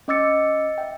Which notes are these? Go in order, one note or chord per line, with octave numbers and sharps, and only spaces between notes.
C#4 D#5 D6 E6 A6 C#7
E5 G5